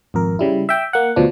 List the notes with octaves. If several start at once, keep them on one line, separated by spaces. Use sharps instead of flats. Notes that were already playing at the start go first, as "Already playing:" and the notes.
G#1 F2 A#4
C#3 G3 E4
E5 G5
A#3 F#5
D2 B2 F3 D4